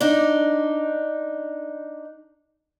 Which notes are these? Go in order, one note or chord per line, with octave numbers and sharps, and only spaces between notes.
D4 D#4